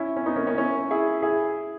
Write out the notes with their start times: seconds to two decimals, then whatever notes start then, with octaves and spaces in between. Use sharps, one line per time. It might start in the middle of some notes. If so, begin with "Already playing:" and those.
Already playing: C#4 E4
0.16 C#4
0.26 B3 D#4
0.36 A#3 C#4
0.47 A#3 C#4
0.58 C#4 E4
0.90 E4 G#4
1.22 E4 G#4